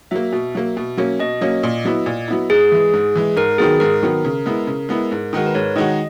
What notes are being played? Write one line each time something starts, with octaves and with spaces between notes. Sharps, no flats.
F#3 A#3 E5
B2
F#3 A#3
B2
F#3 A#3 C#4
B2 D#5
F#3 A#3 C#4
A#2
F#3 B3 E4
A#2
F#3 B3 E4
G#2 G#4
E3 G#3
G#2
E3 G#3
G#2 A#4
D#3 F#3 B3 G#4
G#2 A#4
D#3 F#3 B3
C#3
G#3 B3 E4
C#3
G#3 B3 E4
G#2
D#3 G#3 D#4 F#4 A#4
B4
G#2 C#5
D#3 G#3 D#4 F#4 D#5